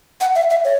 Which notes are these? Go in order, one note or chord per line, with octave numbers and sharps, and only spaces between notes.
F#5
E5
E5
C#5